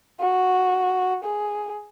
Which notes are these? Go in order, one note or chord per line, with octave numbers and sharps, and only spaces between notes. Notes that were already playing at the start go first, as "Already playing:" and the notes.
F#4
G#4